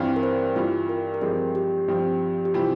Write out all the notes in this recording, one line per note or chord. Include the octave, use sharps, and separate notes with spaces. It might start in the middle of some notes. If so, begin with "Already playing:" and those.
Already playing: G2 E3 G3 C4 F4
A#4
C5
G2 E3 G3 F4
A#4
A#4
G2 F3 G#3 C4 G4 G#4
G4
G2 F3 C4
G4
C3 E3 G3 C4 F4